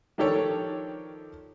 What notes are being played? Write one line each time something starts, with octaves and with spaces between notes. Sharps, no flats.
D#3 F3 D4 G4 A4 C#5